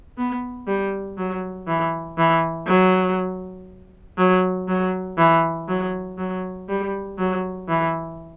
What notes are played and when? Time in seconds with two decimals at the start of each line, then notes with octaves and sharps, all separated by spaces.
0.18 B3
0.67 G3
1.18 F#3
1.68 E3
2.18 E3
2.67 F#3
4.18 F#3
4.68 F#3
5.18 E3
5.68 F#3
6.18 F#3
6.69 G3
7.19 F#3
7.68 E3